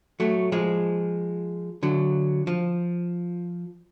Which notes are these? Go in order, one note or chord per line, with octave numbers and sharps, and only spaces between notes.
F#3 A3
F3 G#3
D3 F#3
F3